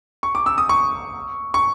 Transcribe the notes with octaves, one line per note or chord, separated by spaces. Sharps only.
C#6
D6
E6
D#6
C#6
C#6